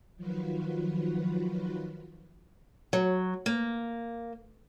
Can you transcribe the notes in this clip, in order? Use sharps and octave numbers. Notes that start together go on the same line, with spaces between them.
D#3 F3 F#3 F4 F#4 B4
F#3
A#3